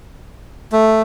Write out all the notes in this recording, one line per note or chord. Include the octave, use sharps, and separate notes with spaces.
A3